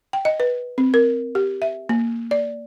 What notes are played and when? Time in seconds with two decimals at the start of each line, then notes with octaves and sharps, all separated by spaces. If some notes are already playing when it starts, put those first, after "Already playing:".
0.13 G5
0.25 D#5
0.40 B4
0.78 C4
0.94 A#4
1.35 G4
1.62 E5
1.89 A#3
2.31 D5